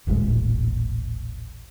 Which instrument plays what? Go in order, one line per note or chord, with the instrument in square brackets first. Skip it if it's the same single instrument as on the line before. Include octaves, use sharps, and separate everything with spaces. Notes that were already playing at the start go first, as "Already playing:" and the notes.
[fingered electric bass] D#1 A1 A#2 G#3